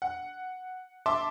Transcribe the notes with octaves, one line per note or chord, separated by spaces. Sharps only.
F#5
E5 A5 C6 D6